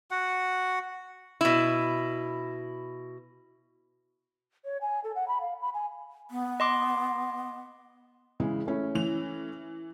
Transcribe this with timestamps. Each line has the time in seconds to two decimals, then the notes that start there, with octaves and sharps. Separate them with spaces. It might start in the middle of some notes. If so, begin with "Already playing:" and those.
0.11 F#4 F#5
1.41 B2 E4
4.65 C#5
4.81 G#5
5.04 A4
5.15 F#5
5.28 B5
5.41 F5
5.62 B5
5.74 G#5
6.31 B3
6.60 D#5 C6 D6
8.40 C#3 E3 G#3
8.66 A3 C#4 E4
8.95 E3 F7